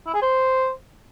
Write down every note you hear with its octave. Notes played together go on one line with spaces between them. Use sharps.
E4
G#4
C5